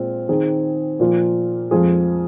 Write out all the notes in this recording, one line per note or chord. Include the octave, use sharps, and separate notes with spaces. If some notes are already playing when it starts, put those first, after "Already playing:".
Already playing: A#2 G#3 C4 F4
D#3 C4 G#4
A#2 F3 A#3 F4
F2 F3 G#3 F4 G#4